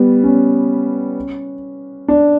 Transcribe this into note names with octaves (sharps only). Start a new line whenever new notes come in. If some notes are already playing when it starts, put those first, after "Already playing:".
Already playing: G3 B3
C#4
D4